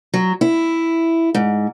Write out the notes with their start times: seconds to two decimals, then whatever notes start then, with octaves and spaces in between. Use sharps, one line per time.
0.14 F#3
0.41 E4
1.35 G#2